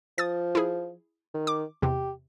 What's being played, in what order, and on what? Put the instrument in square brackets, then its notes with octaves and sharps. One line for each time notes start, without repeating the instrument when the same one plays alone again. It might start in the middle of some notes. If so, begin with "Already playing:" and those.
[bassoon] F3 [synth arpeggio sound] D#6 A6
[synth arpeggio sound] E4 G#4
[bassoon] D#3
[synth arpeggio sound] D6
[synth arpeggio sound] E2 C3 [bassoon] G4